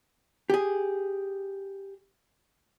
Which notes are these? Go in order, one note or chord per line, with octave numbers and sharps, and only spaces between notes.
G4 G#4